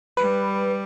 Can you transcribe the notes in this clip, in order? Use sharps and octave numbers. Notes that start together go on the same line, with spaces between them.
G3 B4